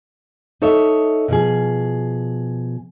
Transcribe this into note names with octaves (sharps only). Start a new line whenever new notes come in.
D#4 A4 C#5 D#5 E5
B2 F3 G#4